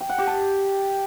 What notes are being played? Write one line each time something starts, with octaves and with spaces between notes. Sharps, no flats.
G5
F#5
G4
A5